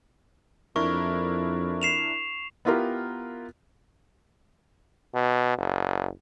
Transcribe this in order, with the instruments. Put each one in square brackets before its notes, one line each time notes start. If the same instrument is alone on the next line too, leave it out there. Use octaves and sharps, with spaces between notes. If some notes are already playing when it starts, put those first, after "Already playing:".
[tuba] F2 [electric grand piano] D4 E4 A#4 [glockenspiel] C#6
[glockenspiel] C7 E7 F7
[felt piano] B3 E4 F4 G4 A#4
[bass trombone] B2
F#1